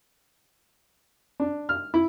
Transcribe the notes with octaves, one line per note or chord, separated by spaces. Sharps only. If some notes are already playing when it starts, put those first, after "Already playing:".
D4
F6
E4